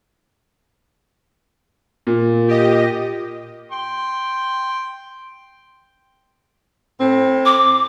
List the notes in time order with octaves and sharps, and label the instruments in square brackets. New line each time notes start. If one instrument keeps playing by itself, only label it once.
[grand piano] A#2
[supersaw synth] G4 D#5
[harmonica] G5 C6
[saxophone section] A2 C4
[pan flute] D6